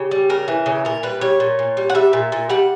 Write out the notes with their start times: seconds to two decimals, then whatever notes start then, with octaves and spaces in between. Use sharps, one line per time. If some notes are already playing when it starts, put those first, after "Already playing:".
Already playing: C#3 G4
0.11 G3
0.30 C#3 A#4
0.48 E3
0.66 C#3
0.85 A#2 A#4
1.03 G3 B4
1.21 G3 C#5
1.40 A#2
1.59 A#2
1.77 G3
1.90 F#5
1.95 G3 E5
2.13 A#2
2.32 A#2
2.50 G3 F#5